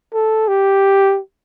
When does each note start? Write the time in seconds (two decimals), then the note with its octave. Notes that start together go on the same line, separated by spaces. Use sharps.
0.13 A4
0.48 G4